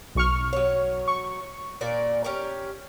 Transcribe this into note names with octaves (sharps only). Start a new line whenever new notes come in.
B1 C#6 F6
F#3 C#5
C#6
A#2 A#4 D5
C#4 G4 A#4